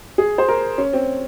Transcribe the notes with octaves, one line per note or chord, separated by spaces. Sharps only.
G#4
C5
A#4
C#4
C4